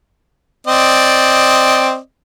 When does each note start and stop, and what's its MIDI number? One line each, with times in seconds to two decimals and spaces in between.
0.67 1.97 60
0.67 1.97 74
0.67 1.97 75